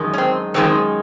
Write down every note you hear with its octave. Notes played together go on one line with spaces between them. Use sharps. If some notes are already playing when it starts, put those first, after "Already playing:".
Already playing: F#2 D#3 G#3
C#4
C4
F#2 D#3 G#3 C4